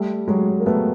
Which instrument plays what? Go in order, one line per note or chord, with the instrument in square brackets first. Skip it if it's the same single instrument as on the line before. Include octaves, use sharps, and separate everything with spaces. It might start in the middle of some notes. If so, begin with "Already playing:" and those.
Already playing: [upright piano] G3 A3
F#3 G#3
A#3
A3 B3